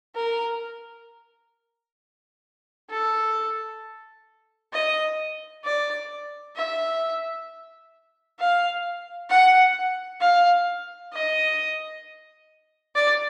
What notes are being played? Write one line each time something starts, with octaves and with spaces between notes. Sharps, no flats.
A#4
A4
D#5
D5
E5
F5
F#5
F5
D#5
D5